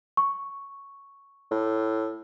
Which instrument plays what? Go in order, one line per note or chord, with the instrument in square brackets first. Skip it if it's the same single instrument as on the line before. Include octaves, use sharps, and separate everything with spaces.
[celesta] C#6
[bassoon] A2